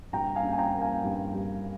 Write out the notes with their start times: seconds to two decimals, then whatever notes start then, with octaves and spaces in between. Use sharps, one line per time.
0.12 G2 G5 A#5
0.36 F5 G#5
0.43 C#4
0.53 G#5
0.58 G5 A#5
0.74 A#3
0.81 F5 G#5
1.04 G2
1.34 G3